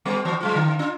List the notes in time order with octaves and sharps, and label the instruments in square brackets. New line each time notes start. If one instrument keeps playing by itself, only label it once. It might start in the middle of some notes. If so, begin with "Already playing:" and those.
[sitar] G3 B3
E3 F#4 C5
F#3 G#3 F4
D3
D4 F4